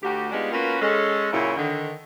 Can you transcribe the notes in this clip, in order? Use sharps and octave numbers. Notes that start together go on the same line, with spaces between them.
D2 F#4 G4
G#3 B3 D4 D#4 F4 G4
A#3 C#4 F4 F#4 B4
G#3 C#4 A4
A#2 C#3 F#3 C#4 E4
D3 D#3